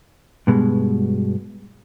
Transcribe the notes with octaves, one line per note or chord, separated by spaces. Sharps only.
G2 B2 G#3